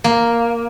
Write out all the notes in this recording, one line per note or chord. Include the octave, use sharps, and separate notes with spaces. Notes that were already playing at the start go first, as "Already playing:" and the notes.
A#3